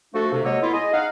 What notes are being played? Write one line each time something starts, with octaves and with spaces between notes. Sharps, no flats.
F3 A3 D4 F#4 A4
C3
F#3 G#3 A#3 A4 C#5 D#5
B3 E4 F4
G#4 D#5
D#4 F5 F#5